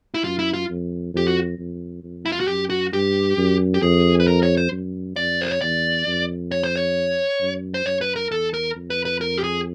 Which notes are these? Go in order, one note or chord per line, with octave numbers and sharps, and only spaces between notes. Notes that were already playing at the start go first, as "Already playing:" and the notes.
E4
F#2 F4
E4
F4
F2
F2 G4
F#4
F2
F2
E4
F4
F#4
F#2 G4
F#4
G2 G4
F#2
G4
F2 G#4
B4
A#4
C#5
C5
F#2
F2 D5
C5
C#5
E2 D5
F2
C#5
C5
C#5
F#2
C5
F#2 C#5
B4
A#4
E2 A4
A#4
F2
B4
B4
A#4
G4
G#4